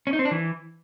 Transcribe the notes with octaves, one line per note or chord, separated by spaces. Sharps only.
C#4
D#4
C4
D4
E3